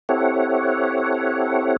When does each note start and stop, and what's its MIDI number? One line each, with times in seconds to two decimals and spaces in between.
0.09 1.76 60
0.09 1.76 64
0.09 1.76 67
0.09 1.76 69
0.09 1.76 73
0.09 1.76 78